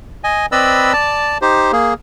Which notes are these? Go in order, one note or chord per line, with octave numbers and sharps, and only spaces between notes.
D#5 G#5
C4 B4 D5 D#5 B5 E6
D5 A5
D#4 G4 C5
A#3 G#4